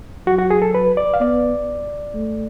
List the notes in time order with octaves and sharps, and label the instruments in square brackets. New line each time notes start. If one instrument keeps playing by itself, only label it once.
[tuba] F#3 [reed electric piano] F#4
[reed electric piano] F#4
G#4
A4
B4
D5
F5
[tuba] B3 [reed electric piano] D5
[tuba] A3